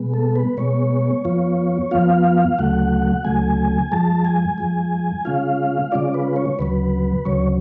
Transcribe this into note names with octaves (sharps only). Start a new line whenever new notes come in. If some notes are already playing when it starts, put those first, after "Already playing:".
Already playing: B2 G#3 B3
A4
B4
B2 G#3 B3 C#5
F2 F3 B3 F4
F2 F3 B3 F4 F5
D2 C#3 F#3 A3 F#5
D2 C#3 F#3 A3 G#5
F2 F3 G#3 A5
G#5
F2 F3 G#3
C#3 G#3 C#4 F4 F5
C#3 G#3 C#4 F4 D5
B4
C#5
D2 C#3 F#3 B4
D2 C#3 F#3 C#5